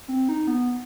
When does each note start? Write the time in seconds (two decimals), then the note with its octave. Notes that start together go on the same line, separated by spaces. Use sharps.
0.08 C4
0.29 D#4
0.47 B3